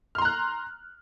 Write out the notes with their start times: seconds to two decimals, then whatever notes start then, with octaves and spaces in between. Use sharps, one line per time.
0.15 F6
0.18 C6
0.22 A#5
0.25 F#6